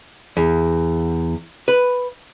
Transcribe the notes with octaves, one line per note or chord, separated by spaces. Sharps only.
E2
B4